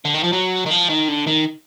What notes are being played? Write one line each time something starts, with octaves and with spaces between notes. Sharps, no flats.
D3
D#3
F3
F#3
D#3
F3
D#3
D3
D#3